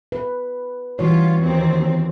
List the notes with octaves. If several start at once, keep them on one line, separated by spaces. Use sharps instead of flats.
B4
E3 G3 F4 F#4 C#5
D#2 C4